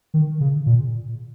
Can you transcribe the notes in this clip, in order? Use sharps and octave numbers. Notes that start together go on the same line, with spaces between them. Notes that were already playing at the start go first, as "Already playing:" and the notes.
D#3
C#3
A#2